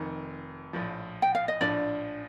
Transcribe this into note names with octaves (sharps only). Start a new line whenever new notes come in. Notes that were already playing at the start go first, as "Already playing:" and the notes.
Already playing: F1 F2 D#3
A#1 A2 F3
G5
F5
D#5
A#1 A2 F3 D4 D5